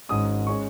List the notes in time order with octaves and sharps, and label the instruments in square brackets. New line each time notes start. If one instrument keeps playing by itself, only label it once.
[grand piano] G#1 G#2 G#3 C#4 D#6
G#3 C#4 C#6